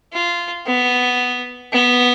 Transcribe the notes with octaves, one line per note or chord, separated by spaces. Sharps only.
F4
B3
B3